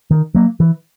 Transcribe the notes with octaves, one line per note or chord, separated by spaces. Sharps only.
D#3
F#3 A#3
E3